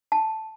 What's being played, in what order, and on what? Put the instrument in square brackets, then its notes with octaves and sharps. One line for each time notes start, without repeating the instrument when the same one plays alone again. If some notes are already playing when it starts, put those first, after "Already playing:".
[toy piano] A5